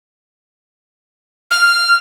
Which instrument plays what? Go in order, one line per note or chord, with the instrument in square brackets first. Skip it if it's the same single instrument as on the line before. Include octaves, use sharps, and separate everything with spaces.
[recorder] F6